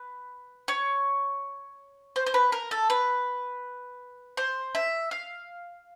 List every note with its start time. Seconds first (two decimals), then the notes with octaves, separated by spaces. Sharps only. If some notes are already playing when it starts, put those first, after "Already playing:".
Already playing: B4
0.68 C#5
2.16 C5
2.27 C5
2.34 B4
2.52 A#4
2.71 A4
2.90 B4
4.37 C5
4.75 E5
5.11 F5